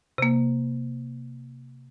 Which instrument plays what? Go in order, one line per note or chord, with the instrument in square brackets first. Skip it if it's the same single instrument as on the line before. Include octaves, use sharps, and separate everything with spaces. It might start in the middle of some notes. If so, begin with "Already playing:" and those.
[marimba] C3 A#3